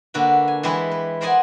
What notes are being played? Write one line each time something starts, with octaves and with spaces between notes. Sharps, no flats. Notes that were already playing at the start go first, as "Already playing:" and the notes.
D3 A#3 F#4 B4
G#5
E3 G#3 E4 G4 B4
B4
A#4 C5 D5 D#5 F#5 G#5